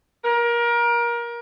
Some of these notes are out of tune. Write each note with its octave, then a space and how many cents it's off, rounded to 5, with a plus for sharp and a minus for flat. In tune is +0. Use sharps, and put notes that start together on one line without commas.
A#4 +25